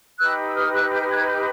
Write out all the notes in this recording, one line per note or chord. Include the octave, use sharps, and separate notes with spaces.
D#4 G4 B4 E6 F#6
E6
D#6 F6
E6 F#6
F6 G6
F#6 G#6
F6 G6